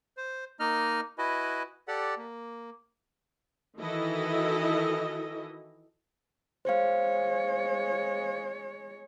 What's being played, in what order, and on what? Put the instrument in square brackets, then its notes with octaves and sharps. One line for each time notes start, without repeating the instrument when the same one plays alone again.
[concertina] C5
A#3 D#4 D#5 F6
E4 F#4 B4 D#5 G#5
G4 A4 D5 F#5
A#3
[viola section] D#3 E3 E4 F#4 A4 D#5
[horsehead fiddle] G#3 C#5 [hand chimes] C5 F5